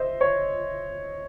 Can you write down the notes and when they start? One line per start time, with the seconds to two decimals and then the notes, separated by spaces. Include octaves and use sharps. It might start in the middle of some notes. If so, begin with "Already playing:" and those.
Already playing: C5 D#5 E5
0.21 C#5